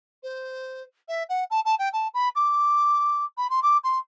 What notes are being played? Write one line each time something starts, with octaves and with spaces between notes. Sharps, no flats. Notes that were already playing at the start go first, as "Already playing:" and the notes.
C5
E5
F#5
A5
A5
G5
A5
B5
D6
B5
C6
D6
C6